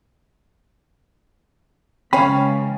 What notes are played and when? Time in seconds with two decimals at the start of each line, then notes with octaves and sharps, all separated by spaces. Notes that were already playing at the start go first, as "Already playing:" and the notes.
2.13 C#3 E3 G#3 C#4 C#5 F5 G5 B5